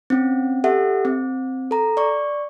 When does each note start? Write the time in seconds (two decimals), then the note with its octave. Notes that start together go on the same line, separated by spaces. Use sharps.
0.10 C4 C#4
0.64 G4 A4 E5 F#5
1.05 C4
1.71 A4 A#5
1.97 D5 C#6